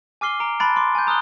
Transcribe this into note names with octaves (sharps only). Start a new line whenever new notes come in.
G#5 D6 F6 C7 G7
A#5 D7
A5 B5 C6 F#6 A6 D7
C6 D6
G#5 G6
A#5 D#6 F6 F#6 G7